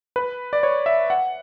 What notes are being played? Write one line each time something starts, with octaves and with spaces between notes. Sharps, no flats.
B4
D5
C#5
E5
F#5